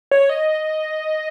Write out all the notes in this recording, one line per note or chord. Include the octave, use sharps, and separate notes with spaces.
C#5
D#5